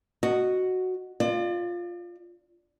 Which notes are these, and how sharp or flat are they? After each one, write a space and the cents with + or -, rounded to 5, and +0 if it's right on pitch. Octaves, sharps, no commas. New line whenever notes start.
F#4 +0 D#5 -10
F4 +0 D5 +40